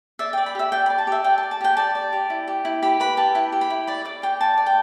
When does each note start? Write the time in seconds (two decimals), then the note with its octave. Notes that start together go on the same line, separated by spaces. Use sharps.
0.19 D5 E5
0.33 G5
0.37 D5
0.46 B5
0.55 G4 E5
0.72 D5 G5
0.86 B5
0.90 D5
0.98 A5
1.07 G4 E5
1.24 D5 G5
1.38 A5
1.43 D5
1.51 A5
1.61 G4 G5
1.77 D5 A5
1.95 D5
2.13 G4
2.30 E4
2.48 G4
2.65 E4
2.82 G4 B5
3.00 B4 B5
3.17 G4 A5
3.35 E4 G5
3.52 G4
3.61 B5
3.70 E4
3.87 D5 B5
4.05 D5 D6
4.22 G4 G5
4.41 D5 A5
4.58 D5
4.66 G5